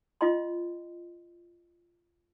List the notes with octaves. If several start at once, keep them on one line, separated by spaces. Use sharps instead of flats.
F4 D#5 G5 C6